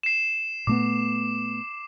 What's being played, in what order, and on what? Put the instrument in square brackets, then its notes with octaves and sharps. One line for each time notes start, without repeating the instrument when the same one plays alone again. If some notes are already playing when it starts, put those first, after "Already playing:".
[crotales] C7 E7
[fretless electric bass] A#2 A3 B3 [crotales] D6